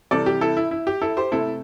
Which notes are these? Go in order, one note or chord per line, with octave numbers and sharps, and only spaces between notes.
C3 E3 G3 A4 D5
G4
E4 A4
E4
E4
G4
E4 A4
G4 C5
C3 A3 E4 A4